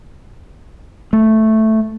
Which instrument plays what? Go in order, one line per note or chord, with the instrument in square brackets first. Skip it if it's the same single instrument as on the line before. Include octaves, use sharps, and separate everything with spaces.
[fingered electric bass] A3